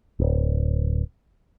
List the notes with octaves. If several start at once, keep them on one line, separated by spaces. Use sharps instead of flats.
D1